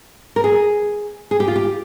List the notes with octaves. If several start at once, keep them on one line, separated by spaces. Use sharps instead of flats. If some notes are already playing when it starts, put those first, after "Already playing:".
A#4
G#4
G#4
G4
F4
G4